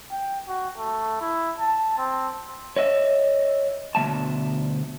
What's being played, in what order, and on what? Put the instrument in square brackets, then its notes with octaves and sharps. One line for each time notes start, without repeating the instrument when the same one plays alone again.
[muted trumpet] G5
F#4
A3
E4
A5
C4
[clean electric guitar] C#5 D#5 E5
D2 B2 F#3 E5 A5